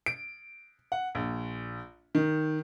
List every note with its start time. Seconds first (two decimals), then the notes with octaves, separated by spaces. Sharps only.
0.06 D7
0.92 F#5
1.15 A#1
2.15 D#3